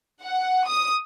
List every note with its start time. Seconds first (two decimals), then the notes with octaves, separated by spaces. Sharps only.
0.23 F#5
0.68 D#6